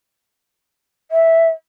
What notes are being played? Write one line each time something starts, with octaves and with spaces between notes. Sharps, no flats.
E5